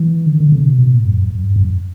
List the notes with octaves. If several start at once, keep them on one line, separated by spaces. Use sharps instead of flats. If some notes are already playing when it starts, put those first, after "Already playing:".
Already playing: E3
D3
D3
C#3
B2
B2
A2
F#2
F#2
F#2
G2
F#2